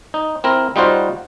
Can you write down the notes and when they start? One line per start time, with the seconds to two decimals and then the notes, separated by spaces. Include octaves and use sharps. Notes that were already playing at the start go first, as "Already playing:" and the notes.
0.14 D#4
0.44 C4 E4 A#4
0.76 G3 D#4 F4 F#4 C5